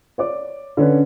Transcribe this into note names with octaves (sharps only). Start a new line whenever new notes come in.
C#5 D5 D6
D3 C#4 B4